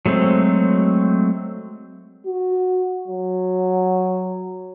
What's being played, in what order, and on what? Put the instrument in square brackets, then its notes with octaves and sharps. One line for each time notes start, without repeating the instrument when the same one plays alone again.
[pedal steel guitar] F#3 G#3 A3 C4
[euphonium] F#4
F#3